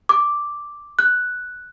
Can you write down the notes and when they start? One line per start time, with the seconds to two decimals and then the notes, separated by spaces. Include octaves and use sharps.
0.09 D6
0.99 F#6